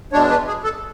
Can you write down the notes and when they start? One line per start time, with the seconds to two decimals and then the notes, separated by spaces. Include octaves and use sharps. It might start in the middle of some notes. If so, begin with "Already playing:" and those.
0.13 E2 B2 G#3 D4 C#5
0.30 B4
0.47 G#4
0.64 A4